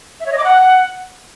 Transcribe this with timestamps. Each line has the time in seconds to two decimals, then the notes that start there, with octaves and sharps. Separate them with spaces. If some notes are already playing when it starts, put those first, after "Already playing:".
0.20 E5
0.26 C#5
0.32 D#5
0.38 D6
0.44 F#5